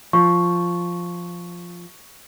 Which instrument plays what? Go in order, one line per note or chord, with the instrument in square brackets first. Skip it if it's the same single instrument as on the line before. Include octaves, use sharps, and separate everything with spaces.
[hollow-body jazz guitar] F3 [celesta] C#6